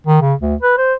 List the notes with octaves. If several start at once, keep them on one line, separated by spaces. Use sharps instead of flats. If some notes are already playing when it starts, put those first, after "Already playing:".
D#3
C#3
D2
B4
C5